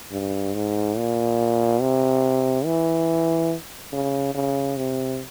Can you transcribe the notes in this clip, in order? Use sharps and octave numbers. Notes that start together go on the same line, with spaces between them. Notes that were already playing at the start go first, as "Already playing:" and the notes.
G2
G#2
A#2
C3
E3
C#3
C#3
C3